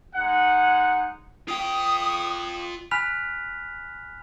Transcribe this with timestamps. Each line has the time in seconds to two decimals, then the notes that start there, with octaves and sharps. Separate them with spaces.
0.15 G#3 D#4 F#5
1.48 F4 G5 D#6
2.91 G#5 B5 F6 F#6 B6 F7